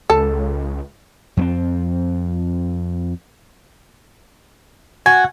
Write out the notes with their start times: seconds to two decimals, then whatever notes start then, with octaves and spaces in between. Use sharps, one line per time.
0.10 C#2 A4
1.37 F2 A#3 C4
5.06 F#4 G#5